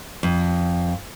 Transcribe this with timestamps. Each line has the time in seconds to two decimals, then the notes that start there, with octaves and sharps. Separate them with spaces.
0.23 F2